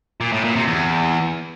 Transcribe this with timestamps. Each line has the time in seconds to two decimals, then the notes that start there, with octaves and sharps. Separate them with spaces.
0.21 A#2
0.32 A2
0.44 A#2
0.56 C3
0.68 E2